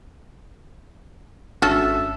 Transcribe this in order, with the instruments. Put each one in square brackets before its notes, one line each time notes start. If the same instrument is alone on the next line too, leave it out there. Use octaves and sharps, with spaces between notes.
[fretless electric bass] G#1 D4 [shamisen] C#4 F#4 A4 [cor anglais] E5